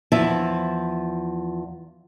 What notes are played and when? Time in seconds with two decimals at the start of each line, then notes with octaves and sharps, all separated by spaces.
0.12 E2 F3 E4 E5 A5